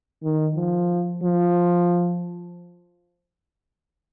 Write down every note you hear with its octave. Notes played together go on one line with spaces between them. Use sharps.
D#3
F3
F3